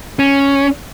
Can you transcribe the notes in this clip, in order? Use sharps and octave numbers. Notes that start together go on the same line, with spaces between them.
C#4